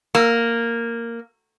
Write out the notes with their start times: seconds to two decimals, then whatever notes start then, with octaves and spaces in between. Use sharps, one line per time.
0.15 A#3